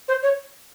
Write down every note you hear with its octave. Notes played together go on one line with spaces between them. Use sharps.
C5
C#5